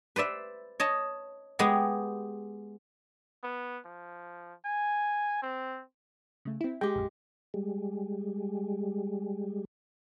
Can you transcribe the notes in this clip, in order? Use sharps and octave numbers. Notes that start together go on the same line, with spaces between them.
B4 C5 D5 E5
C#5 D#5 A5
G#3 B3 G4 G#4
B3
F3
G#5
C4
C#3 A3
C4 E4
G#3 G4 G5
A#1 F#2
G3 G#3